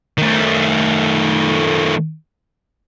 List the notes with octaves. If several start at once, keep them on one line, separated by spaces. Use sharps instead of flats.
D#3 A3